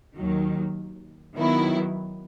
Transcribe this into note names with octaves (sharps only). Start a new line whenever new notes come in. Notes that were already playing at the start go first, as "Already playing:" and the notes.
D#2 D#3 F#3
D#3 F#3 B3 E4